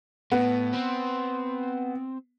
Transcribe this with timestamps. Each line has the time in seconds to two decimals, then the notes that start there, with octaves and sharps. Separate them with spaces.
0.32 A2 B3
0.73 C4